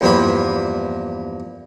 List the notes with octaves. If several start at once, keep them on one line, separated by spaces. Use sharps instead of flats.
E2 G2 F3 A#3 E5 B5